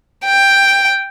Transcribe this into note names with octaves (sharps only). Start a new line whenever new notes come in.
G5